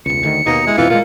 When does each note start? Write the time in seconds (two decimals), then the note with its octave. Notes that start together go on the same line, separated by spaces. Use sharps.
0.06 E1 C#2 C#7
0.23 D2 D#3
0.46 D#2 B2 D#3 A#3 D#4
0.67 G#3 E4
0.78 F2 B2 E3 F4
0.90 A#2 G#3 A#3 F4